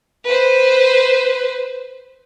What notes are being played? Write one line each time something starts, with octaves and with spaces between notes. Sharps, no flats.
B4 C5